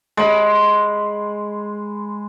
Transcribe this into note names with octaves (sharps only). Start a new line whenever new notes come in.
G#3 B5